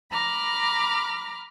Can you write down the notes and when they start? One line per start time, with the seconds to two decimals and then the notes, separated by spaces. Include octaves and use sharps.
0.11 A#5 B5 D6 F6